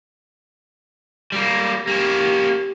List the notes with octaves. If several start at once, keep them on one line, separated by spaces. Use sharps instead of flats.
G3 A#3
A#3 C#4 G4